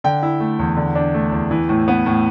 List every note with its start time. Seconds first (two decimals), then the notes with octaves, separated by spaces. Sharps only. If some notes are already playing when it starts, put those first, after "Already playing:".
0.04 D3 G5
0.23 E4
0.40 A3
0.59 E2
0.77 D3
0.95 D4
1.14 A3
1.32 E2
1.51 E3
1.69 A2
1.88 B3
2.06 A2